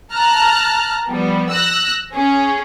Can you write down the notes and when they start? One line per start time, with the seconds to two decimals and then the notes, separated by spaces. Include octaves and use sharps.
0.13 A5 A#5 F6 F#6
1.07 F3 G3 B3
1.50 E6 F#6 A#6
2.13 C#4 G#4